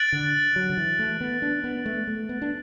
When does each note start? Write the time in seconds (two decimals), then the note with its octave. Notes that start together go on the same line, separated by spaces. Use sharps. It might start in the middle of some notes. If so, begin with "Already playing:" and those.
Already playing: F#6 A6 D7 F#7
0.12 D3
0.56 F#3
0.70 D3
0.77 E3
0.99 A3
1.21 B3
1.42 D4
1.64 B3
1.86 A3
2.07 A3
2.29 B3
2.42 D4